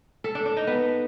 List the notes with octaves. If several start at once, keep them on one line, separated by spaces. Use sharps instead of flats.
A4
D4
D4
D#4
B3